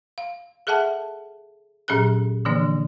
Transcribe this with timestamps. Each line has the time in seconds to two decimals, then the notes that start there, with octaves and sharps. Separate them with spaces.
0.18 F5
0.67 G#4 A4 E5 F#5 A5
1.88 A#2 F#3 C#4 G#4 A4 F#6
2.45 D3 E3 F3 A#3 D4